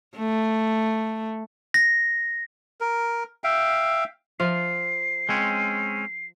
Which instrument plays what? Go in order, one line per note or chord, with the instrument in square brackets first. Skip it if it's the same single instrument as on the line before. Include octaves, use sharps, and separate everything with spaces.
[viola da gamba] A3
[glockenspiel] A#6
[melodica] A#4
E5 F5 G5
[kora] F3 F5 [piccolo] C7
[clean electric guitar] G#3 C4 C#4